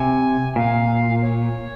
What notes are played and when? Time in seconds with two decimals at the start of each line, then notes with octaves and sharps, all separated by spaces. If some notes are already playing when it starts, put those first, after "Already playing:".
Already playing: C3 G#5
0.56 A#2 F5
1.22 C#5